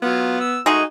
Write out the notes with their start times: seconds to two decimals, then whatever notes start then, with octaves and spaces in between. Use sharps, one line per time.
0.02 F#3 B3 F4
0.40 E6
0.66 G#3 A3 D#4 F#4 G#4